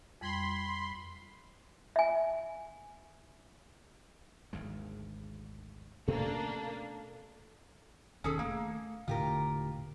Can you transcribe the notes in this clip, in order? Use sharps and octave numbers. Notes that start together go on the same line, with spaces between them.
F2 G3 B5 C6 G#6
E5 G#5
G#1 D2 G#3
B2 A3 A#3 C#4 D4 A4
E1 D#3 C#4 G#4 A4
A3 A#3
E1 A2 D3 F4 G4 A#4